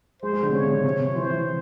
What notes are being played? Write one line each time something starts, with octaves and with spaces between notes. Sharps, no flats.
G#3 C5
G#3
D3
C3
C#3 C#5
C#3
C3
C3
C3
E3 C5
E3